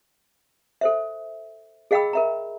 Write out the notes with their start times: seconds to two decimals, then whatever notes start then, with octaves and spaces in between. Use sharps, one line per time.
0.81 A4 C5 E5
1.91 G#4 D#5 F5 G5 B5 E6
2.13 A#4 E5 A#5